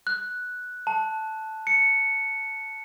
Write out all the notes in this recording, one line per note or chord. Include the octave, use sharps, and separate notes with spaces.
F#6
A5
C#7